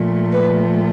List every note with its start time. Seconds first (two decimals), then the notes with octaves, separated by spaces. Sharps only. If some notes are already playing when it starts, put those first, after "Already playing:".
Already playing: A#2 F3 A3
0.32 B4